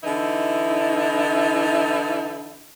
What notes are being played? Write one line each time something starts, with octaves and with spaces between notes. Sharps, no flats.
D3 E3 D#4 E4